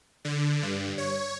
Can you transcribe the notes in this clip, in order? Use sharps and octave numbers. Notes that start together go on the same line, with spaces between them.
D3
G2
C#5